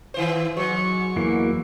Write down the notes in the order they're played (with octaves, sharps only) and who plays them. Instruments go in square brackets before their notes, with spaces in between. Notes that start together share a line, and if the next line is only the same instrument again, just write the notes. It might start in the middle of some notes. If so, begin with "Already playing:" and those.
[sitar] D#3 E3 C5
[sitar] G#2 [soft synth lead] F#3 [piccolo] C#6
[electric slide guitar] E2 E3 A#3